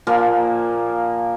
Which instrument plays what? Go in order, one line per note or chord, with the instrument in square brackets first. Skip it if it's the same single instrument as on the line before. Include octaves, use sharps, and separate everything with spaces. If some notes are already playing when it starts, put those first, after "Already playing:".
[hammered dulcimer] A#2 F3 A#3 A#4